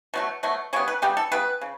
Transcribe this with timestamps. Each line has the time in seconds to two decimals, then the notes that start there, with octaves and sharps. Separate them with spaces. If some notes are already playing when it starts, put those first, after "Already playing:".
0.14 B2 F#3 A3
0.43 B2 F#3 A3
0.73 C#3 G3 B3 C#5
0.88 B4
1.02 C#3 G3 B3 G4
1.17 A4
1.32 C#3 G3 B3 B4
1.61 C#3